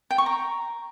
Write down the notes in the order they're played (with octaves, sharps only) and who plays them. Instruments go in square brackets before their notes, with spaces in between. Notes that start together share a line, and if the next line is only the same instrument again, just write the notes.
[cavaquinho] G5
C#6
A#5